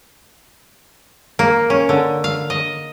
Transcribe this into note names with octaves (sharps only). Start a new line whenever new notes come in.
A#3
C#4
D3
F5
D#5